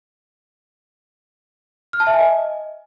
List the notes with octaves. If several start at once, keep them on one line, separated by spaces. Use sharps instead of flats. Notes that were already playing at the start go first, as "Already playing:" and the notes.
F6
A5
E5
G#5
D#5